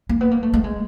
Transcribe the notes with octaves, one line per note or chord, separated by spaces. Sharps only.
A#3
B3
A#3
A3
A3
G#3